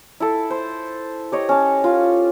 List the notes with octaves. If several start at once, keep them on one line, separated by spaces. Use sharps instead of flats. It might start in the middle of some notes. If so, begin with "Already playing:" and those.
E4 A4
C5
G4 C#5 D#5
C#4 A5
F4